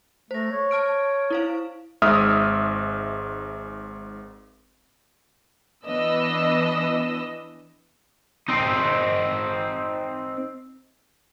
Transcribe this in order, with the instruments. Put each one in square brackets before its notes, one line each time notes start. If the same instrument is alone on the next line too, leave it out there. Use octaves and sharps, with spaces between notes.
[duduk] A3 [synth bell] C5 A#6
[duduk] C#5
[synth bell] A5 F6 D7
E4 C5 F5
[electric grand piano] G#1 G#2 E5 D#6 F6
[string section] E3 B3 D4 B4 D#5 E6
[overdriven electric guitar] C4 D#4